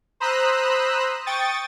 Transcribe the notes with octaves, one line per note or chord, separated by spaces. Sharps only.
C5 A#5 B5 D#6 E6 F#6
G5 C#6 D#6 A6